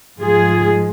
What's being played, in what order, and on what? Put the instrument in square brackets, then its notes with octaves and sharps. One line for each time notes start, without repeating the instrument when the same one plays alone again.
[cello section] G#2 F3 G#3 F4 G#4